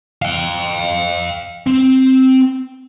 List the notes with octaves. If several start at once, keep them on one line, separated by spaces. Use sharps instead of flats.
F5 G5
C4